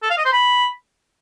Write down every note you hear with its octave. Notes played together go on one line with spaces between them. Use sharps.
A4
F5
D#5
C5
B5